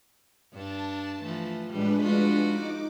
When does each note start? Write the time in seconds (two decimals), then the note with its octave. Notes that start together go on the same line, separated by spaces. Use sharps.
0.54 G2 D4 A5
1.21 E3 F3 A3
1.71 A2 G3 G#3 D4 B4
2.01 F3 F4 F#4
2.46 D#4 D6